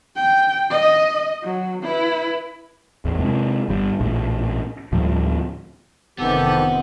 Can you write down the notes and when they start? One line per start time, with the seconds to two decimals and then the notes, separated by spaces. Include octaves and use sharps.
0.16 G5
0.70 D#5
1.43 F#3
1.83 E4 B4
3.05 A1 E2
3.18 C3 G#3
3.69 G1 G3
4.00 A#1 A2
4.92 D2 A2 F3 G3
6.18 F1 D#3 E3 B3 C4 G4 A4